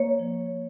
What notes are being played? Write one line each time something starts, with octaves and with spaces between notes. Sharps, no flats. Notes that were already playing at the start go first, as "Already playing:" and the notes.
Already playing: A#3 C#5
F3